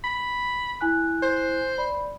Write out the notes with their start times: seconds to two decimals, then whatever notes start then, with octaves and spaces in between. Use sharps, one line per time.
0.04 B5
0.81 E4 G#5 F#6
1.23 C5
1.78 D5 B5